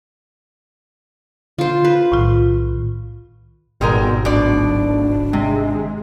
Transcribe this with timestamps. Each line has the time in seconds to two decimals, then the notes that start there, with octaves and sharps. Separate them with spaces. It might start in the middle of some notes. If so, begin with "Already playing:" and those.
1.58 D3 F4 C5
1.85 F4 B4
2.12 B1 A2 D#3 F4
3.81 G#1 B2 G3 G#3 A#4
4.25 D1 B2 D4 D5
5.33 C3 G#3